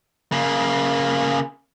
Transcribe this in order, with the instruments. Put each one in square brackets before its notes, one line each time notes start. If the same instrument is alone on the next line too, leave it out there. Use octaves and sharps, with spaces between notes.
[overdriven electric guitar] C#3 A#3